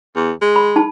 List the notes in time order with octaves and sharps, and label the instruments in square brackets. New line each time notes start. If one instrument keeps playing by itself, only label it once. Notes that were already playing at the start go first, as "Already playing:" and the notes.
[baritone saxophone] E2
G#3
[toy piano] B5
D#4 A5